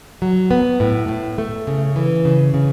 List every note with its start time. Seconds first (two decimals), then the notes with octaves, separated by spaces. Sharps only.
0.22 F#3
0.51 B3
0.80 A2
1.08 A2
1.38 A3
1.67 C#3
1.96 E3
2.25 C#3
2.54 C#3